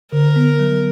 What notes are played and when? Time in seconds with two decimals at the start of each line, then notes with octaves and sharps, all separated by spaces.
0.13 D3 A#4
0.36 B3
0.59 F#3